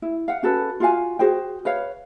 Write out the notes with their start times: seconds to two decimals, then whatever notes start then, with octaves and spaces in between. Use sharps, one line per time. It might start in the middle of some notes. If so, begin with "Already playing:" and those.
0.02 E4
0.28 F5 F#5
0.43 C#4 F#4 A4 B4
0.80 F4 F#4 F5 G#5
1.19 F#4 G#4 C5 G5
1.65 B4 C#5 F5